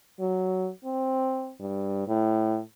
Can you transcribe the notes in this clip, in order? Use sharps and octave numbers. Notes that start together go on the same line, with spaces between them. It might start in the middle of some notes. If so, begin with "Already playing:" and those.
F#3
C4
G2
A2